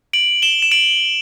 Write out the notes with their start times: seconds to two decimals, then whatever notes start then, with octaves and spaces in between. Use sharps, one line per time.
0.13 D7 F#7
0.42 E7 G7
0.62 E7
0.71 D7 F#7